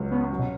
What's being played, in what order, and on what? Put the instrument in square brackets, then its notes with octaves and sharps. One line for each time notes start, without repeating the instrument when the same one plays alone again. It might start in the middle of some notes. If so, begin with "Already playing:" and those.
Already playing: [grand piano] C#2 C#3 F#3
[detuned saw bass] B3 [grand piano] C#4
[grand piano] F#3
[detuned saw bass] B2